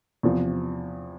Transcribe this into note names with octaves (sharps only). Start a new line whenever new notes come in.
E2 C3 F3